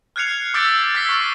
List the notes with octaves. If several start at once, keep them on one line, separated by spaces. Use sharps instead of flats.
F6 F#6 G#6 C7 C#7 F7
D6 E6 G6 A6 B6 D7
E6 A6 B6 C7 G7
C#6 F6